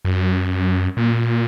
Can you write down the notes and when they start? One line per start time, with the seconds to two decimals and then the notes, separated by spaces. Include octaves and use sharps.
0.05 F#2
0.97 A#2